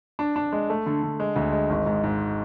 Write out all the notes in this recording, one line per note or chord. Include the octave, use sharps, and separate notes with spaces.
D4
D4
G#3
A3
D3
D3
G#3
D2
G#3
G#1
G#2
G#2